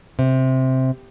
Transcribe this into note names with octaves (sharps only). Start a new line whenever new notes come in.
C3